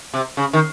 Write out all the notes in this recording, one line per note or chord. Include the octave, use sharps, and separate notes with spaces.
C3
C#3
D#3